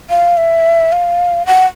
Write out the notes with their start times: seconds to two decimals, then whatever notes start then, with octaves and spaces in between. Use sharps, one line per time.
0.10 F5
0.37 E5
0.92 F5
1.46 F#5